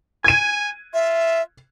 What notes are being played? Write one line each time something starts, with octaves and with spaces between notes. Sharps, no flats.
G#5 G#6 D#7
F4 E5